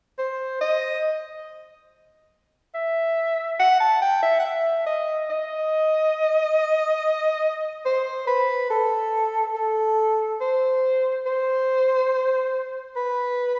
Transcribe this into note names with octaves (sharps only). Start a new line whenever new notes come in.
C5
D#5
E5
F#5
A5
G5
E5
F#5
E5
D#5
D#5
C5
B4
A4
A4
C5
C5
B4